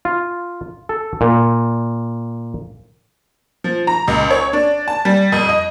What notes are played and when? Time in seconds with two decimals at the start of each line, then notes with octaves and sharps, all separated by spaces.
0.05 F4
0.89 A4
1.21 A#2
3.64 F3
3.87 A#5
4.08 C#2
4.31 C#5
4.53 D4
4.88 A5
5.05 G3
5.32 F2
5.49 D#5